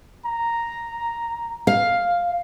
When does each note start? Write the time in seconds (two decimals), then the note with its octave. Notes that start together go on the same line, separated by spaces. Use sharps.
0.25 A#5
1.67 F5